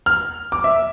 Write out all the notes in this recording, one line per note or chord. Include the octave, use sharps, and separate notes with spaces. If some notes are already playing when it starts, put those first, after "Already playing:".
F6
D6
E5